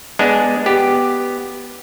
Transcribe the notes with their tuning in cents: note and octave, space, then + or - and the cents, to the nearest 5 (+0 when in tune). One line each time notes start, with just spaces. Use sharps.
G#3 +0 B3 +0 D4 -5
B3 +0 G4 +0